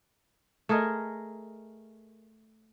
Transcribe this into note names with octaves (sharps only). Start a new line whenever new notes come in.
A3 G#4 A#4 D#5